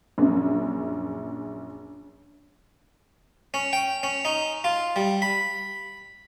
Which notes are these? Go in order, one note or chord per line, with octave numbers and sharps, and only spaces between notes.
A#1 F#2
C#4
G5
C#4
D#4
F4
G3
B5